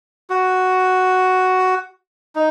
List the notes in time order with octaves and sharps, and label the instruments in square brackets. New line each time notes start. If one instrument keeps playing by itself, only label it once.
[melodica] F#4
D#4